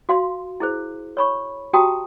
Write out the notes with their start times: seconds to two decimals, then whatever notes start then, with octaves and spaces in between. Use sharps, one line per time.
0.09 F#4 F5 C6
0.60 E4 G#4 C5
1.17 C#5 B5 C#6
1.73 F#4 G4 G5 A5 A#5 D#6